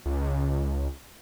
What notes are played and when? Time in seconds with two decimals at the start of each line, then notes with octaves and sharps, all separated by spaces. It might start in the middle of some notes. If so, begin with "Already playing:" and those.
0.06 C#2